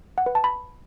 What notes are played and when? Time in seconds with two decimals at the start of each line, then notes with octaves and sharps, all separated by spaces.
0.18 F#5
0.26 B4
0.35 A5
0.44 B5